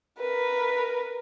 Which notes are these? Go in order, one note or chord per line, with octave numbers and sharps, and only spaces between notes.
A#4 B4